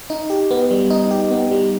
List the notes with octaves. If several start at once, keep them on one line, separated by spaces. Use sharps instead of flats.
D#4
G4
B3
G3
D#4
G4
B3
G3